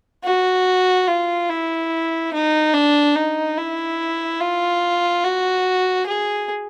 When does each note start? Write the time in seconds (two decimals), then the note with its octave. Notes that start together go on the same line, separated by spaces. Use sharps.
0.24 F#4
1.08 F4
1.50 E4
2.33 D#4
2.74 D4
3.16 D#4
3.58 E4
4.41 F4
5.24 F#4
6.07 G#4